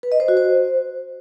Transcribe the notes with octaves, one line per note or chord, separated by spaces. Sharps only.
B4
D#5
C5
F#4
C5